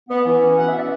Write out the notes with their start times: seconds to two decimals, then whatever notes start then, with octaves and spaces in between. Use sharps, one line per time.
0.09 B3
0.25 E3
0.42 C#4
0.57 B2 F#5
0.69 C#4 E5
0.79 D5